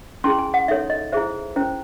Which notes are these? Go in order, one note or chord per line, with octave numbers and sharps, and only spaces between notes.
C#4 E4 G#4 C6
G#5
F#5
D#4 A4 C#5 E5
D#5
E4 G#4 C5 E5
C#4 E4 C5